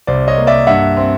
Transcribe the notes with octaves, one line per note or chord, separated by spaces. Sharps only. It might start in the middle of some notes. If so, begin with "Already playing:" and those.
C2 C5 D5
C#5 D#5
A#3
D5 E5
G2 E5 F#5
C4